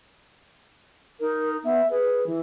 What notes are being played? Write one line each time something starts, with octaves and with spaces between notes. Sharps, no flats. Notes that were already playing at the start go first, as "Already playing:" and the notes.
D#4 A#4
B3 E5
G#4 B4
E3